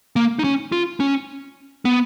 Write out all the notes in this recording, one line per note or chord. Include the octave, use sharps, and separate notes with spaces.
A#3
D#4
C#4
F4
C#4
B3